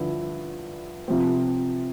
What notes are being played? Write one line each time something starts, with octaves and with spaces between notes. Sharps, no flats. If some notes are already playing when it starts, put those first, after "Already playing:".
Already playing: G2 D3 F3 E4
C3 F3 C4